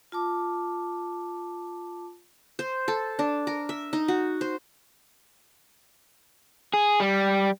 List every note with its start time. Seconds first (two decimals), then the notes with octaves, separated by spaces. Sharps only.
0.12 F4 A5 D6
2.59 C5
2.88 A4
3.19 D4
3.47 A#4
3.69 E5
3.93 D#4
4.08 F#4
4.41 C5
6.74 G#4
7.00 G3